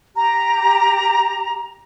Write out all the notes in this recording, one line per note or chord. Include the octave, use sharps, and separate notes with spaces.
G4 A#5